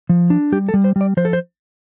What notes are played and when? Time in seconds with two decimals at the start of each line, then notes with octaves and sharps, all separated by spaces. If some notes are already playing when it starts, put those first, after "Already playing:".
0.09 F3
0.30 D4
0.52 G3 G4
0.69 A4
0.74 G3
0.84 C5
0.96 G3
1.01 D5
1.17 F3 C5
1.25 A4
1.33 C5